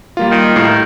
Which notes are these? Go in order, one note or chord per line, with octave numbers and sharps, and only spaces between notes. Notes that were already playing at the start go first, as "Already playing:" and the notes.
G3 A#3 F4
D#3
A2 A#4 C7